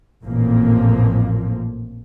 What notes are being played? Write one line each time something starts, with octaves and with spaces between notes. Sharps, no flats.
A1 F2 A#2 F3 A#3